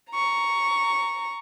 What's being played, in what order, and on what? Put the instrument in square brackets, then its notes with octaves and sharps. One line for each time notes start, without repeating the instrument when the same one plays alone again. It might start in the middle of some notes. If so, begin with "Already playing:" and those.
[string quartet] A#5 C#6